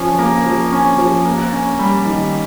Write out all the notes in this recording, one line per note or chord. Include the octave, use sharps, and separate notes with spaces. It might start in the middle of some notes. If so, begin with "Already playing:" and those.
Already playing: F3 C#4
A#3
F3
C#4
F3
A#3
C#4
G3
D#3